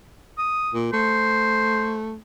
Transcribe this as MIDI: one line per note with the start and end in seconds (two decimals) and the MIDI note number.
0.38 0.74 87
0.74 0.89 46
0.93 2.15 57
0.93 1.95 72